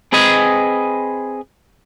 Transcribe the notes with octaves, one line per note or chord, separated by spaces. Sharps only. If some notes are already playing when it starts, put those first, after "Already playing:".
C4 G#4 B4 D#5 G#5